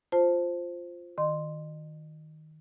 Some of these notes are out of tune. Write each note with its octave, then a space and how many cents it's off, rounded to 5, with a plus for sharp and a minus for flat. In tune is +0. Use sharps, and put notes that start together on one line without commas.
F4 +0 C5 +0 A5 +0
D#3 +0 D#5 -35 C6 +0